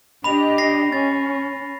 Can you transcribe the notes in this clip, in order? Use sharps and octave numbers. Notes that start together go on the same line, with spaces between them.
D4 G4 D#5 B5 F7
A#6 C7
C#4 A6